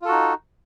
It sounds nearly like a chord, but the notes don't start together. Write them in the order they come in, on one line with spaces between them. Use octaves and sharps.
F4 A4 F#4 D#4